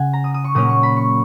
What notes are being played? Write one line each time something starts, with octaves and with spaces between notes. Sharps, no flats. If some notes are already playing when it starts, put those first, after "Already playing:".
Already playing: C#3 F#5 G#5
A#5
D#6
D#6
C#6
A#2 F#3 A#3 C#4 D#6
C#6
B5
C#6